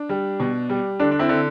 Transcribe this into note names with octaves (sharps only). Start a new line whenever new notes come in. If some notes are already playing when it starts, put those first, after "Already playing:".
Already playing: D4
G3
B2
G3
D3 D4
D4
C4 E4
D3